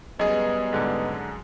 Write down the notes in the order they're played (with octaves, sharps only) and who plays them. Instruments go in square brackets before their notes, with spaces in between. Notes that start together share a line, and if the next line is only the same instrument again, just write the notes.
[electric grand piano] F#2 G#4 [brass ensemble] G3 B3 [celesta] D#5
[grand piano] G#2 D3